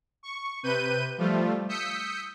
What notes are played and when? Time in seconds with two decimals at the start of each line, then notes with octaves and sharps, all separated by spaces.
0.23 C#6
0.63 C3 B4 G6 D#7
1.18 F3 G3 A3 F4
1.69 D#6 E6 G6 B6 C#7